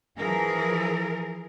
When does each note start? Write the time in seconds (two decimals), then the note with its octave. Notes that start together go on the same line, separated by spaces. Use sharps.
0.18 E3 F3 G#4 A#4